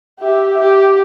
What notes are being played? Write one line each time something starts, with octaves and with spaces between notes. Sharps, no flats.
G4 E5
G4